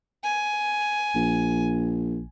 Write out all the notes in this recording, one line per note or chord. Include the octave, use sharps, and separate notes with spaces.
G#5
A#1